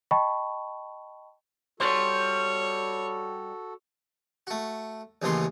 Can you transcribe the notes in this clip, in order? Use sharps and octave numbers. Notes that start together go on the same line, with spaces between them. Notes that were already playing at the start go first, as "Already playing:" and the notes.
D#5 G5 A5 B5 C#6
G3 F#4 A4 C#5 C6
A3 F#4
A1 D#2 A2 C#3 E3 C6